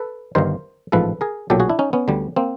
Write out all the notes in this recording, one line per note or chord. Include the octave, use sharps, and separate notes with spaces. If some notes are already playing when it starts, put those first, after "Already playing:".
Already playing: A4 B4
G1 G2 D#3 A#4 C5
A1 G#2 F3 A4 B4
G#4 A#4
B1 A#2 F#3 G4 A4
F#4 G#4
D4 E4
C#4 D#4
B3 C#4
D2 D3 G3
A#3 C4